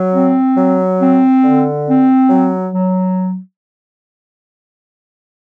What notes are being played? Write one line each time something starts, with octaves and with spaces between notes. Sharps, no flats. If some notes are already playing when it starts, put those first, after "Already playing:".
Already playing: F#3
C4
F#3
C4
D3
C4
F#3
F#3